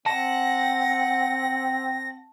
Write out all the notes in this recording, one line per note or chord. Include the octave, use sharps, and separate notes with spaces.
C4 F#5 A5 A#6